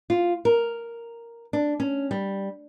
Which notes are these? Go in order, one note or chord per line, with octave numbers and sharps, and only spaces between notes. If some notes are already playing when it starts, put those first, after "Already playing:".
F4
A#4
D4
C#4
G3